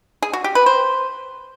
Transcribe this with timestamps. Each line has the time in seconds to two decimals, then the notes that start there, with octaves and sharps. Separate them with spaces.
0.22 G#4
0.33 F#4
0.44 G4
0.55 B4
0.66 C5